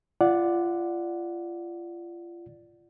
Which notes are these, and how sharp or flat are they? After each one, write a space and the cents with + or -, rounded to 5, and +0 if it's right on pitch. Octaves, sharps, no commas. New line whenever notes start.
F4 -30 D5 +0 F#5 +0